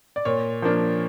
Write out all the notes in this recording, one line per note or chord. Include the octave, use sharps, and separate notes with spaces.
D5
A#2 C#5
F3 A#3 D4